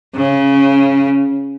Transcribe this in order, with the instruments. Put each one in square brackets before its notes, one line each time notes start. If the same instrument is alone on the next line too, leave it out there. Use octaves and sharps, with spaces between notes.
[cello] C#3